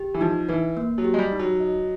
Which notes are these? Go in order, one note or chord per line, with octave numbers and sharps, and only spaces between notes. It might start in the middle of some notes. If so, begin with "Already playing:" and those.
Already playing: G4
E3
F3 D#4
E3 B4
A#3
F#3
G4
G#3
G3
D#4
F#3
D#5